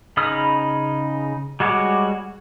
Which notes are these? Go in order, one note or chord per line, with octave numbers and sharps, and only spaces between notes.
C#3 D#4 B5 D#6 F6
G3 G#3 F#4 C#5 D6